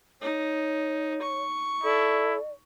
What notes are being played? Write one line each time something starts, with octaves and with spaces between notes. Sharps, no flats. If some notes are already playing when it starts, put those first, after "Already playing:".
D#4 C#5
C#6
E4 A4 D5